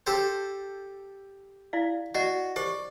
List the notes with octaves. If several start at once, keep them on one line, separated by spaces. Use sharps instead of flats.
G4 A4 C5
E4 D5 F5
F#4 D5 D#5 F#5
G4 C5 D5 C#6